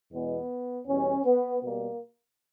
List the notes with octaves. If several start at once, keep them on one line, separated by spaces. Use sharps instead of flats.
E2 B2 G#3 B3
E2 B2 G3 C#4
B3
B2 G3 A#3